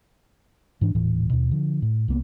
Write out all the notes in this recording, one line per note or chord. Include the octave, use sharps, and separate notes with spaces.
G#2 E3 D4
D#1 A2 E3
D#2 B2
D3 F3
A2
C2 A#3 B3